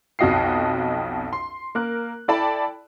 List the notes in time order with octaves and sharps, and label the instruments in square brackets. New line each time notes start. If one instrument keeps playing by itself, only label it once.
[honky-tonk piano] B1 F2 F#4 D#5 G5 C7
C6
A#3 A#4 F#6
E4 A4 D5 G5 A5 B5